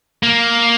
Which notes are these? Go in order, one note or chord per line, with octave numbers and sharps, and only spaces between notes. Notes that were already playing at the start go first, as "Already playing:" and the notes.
A#3